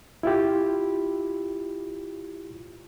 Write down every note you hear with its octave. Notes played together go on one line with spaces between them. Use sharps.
E4 F4 G4